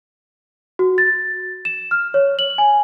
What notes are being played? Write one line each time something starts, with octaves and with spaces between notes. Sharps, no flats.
F#4
A6
E7
F6
C#5
F#7
G#5